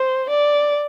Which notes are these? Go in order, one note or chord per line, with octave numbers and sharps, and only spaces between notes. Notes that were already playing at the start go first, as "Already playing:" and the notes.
Already playing: C5
D5